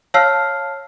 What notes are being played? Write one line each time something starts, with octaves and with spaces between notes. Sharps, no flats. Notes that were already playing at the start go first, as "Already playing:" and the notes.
C#5 F5 A5 E6 F6 C7